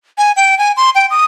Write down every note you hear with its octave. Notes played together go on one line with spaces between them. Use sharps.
G#5
G5
G#5
C6
G5
D#6